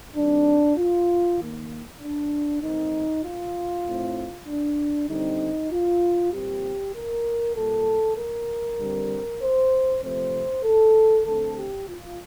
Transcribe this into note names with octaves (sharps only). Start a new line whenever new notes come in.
D#3 G3 C4 D4
F4
D#3 A#3
D4
D#3 A3 C4 D#4
F4
A2 A3 C4
D4
D3 G3 C4 D#4
F4
A#2 G3 C4 G4
A#4
A#2 G3 A#3 A4
A#4
D3 G3 C4
C5
C3 F3 A3 C4 C5
A4
D3 A3 C4 A4
G4
F4